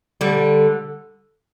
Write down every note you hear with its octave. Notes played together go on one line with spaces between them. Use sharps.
D3 G3